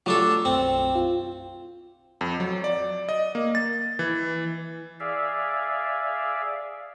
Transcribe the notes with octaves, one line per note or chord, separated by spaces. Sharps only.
F#3 A3 D4 F4 A4
B1 F#2 C4
F4
F2
F#3
D5
D#5
A#3
A6
E3
G#4 D5 E5 F5